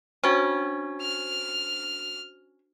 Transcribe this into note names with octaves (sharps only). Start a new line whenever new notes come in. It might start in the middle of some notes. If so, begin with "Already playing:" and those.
C#4 D4 F#4 C5
F6